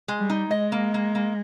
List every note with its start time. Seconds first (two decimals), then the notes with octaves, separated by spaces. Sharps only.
0.08 G#3
0.19 G3
0.30 D#4
0.50 G#3 D#5
0.72 A#3
0.94 A#3
1.15 A#3